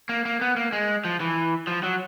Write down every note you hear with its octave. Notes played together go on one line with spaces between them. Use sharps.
A#3
A#3
B3
A#3
G#3
F3
E3
F3
F#3